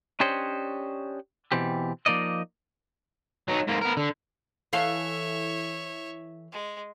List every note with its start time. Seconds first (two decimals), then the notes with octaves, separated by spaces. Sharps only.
0.20 C#4 D4 G4 C5 C#5 D#5
1.52 B2 E3 C4 G4
2.06 F3 A#3 D#4 D5 D#5
3.48 F#3 D#4
3.67 G#2 A#3
3.81 B3 A#4
3.97 D3
4.73 E3 A4 C#5 E5 F5
6.52 G#3